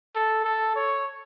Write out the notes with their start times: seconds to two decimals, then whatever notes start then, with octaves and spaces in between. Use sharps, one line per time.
0.15 A4
0.44 A4
0.76 C#5